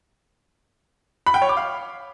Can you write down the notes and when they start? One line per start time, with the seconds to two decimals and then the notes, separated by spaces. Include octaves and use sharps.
1.26 B5
1.34 G5
1.42 C#5
1.49 D6
1.57 F5